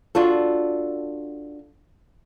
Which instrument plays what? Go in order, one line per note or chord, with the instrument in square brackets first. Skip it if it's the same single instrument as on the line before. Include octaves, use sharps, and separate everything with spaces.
[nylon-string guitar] D4 F4 F#4 A4